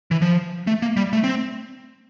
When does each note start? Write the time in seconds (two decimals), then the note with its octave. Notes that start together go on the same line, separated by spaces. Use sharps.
0.11 E3
0.22 F3
0.67 A3
0.82 A#3
0.97 G3
1.13 A3
1.24 C4